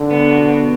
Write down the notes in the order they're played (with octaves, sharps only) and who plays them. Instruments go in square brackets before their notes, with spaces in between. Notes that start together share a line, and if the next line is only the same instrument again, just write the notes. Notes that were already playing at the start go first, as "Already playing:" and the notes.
Already playing: [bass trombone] D3
[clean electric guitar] B3
B2
B2